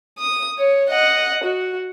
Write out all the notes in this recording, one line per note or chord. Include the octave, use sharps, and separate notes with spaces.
D#6
C#5
D#5 F#5
F#4